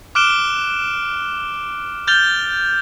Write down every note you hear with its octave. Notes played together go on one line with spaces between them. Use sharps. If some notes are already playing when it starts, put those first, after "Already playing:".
D6 F6 F#6 D7 E7 G7
F6 G6 A6 F7 G7